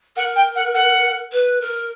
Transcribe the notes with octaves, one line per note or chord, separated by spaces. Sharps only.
A#4 F#5
G5
F#5
F#5
B4
A#4